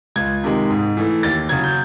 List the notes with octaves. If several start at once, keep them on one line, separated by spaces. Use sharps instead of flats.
C#2 G#6
C3 D#3 G#3
G#2
E3 A3
D#2 A6
C#3 F#3 G#6
G6